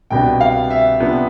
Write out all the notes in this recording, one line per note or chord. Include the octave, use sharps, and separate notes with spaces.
C2 B2 B3 D4 G5
F5
E5
C3 F3 B3 D4